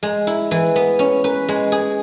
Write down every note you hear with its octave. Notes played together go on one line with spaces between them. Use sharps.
G#3
E4
E3
B3
C#4
B4
G#3
G#4